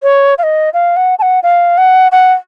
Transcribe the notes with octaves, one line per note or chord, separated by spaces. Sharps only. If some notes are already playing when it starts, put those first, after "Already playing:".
C#5
F5
D#5
F5
F#5
A5
F#5
F5
F#5
F#5